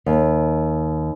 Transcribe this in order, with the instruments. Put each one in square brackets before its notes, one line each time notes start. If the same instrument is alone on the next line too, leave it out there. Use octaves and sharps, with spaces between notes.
[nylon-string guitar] D#2